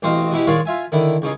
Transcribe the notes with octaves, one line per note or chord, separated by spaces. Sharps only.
A1 B2 C4 C5 D#5 F5
B2 G#3 E4 G4
D#3 G#3 C#5 D5 F5 C6
F4 E5 G#5
D3 D#3 E4
C#2 C#3 D#4 G#4